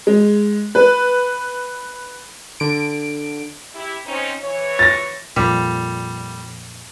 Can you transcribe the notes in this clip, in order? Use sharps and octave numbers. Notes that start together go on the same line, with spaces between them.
G#3
B4
D3 D7
E4 G4
C4 C#4 D#4
E3 C#5
A6 A#6
F2 A#2 G3